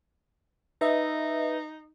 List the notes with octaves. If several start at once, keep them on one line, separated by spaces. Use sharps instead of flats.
D#4 B4 D#5 E5